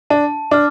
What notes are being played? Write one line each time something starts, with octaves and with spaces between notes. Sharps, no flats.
D4 A5
D4 D6 F6